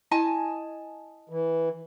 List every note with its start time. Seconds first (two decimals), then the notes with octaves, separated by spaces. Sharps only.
0.11 E4 D#5 G#5 A5
1.29 E3